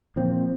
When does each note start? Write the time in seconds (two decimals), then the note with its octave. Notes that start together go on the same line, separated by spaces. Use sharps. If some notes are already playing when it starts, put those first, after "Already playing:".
0.16 A#2 F3 C4